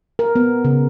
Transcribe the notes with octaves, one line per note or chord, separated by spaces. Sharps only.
A#4
B3
C#3